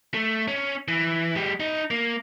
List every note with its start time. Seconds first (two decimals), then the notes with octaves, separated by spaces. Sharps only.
0.14 A3
0.48 C#4
0.88 E3
1.35 G#3 G4
1.60 D#4
1.91 A#3